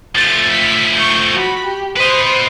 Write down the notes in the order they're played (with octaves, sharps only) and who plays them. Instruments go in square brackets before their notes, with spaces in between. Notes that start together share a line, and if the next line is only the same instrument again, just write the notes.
[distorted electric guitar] F3 A3 [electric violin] A6
[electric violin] B6
C#6 G6
F#4 B5
G4
[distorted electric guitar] B4 D#5 [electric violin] C5